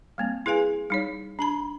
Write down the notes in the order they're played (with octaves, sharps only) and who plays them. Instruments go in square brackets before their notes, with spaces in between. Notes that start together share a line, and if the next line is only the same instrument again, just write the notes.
[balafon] G3 A#3 C4
E4 G#4 B4 F5 G#5
G3 D#4 C#5
D4 A5 B5